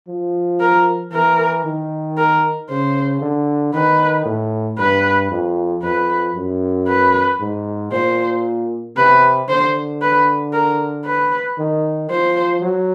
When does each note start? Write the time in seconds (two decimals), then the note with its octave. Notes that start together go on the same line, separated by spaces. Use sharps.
0.08 F3
0.60 A#4
1.12 E3 A#4
1.64 D#3
2.17 A#4
2.69 C#3 C5
3.22 D3
3.74 D#3 B4
4.26 A2
4.78 G2 B4
5.31 F2
5.83 F2 B4
6.36 F#2
6.88 B4
7.40 G#2
7.92 A#2 C5
8.97 C3 B4
9.49 D3 C5
10.01 B4
10.53 A#4
11.05 B4
11.58 D#3
12.10 F3 C5
12.62 F#3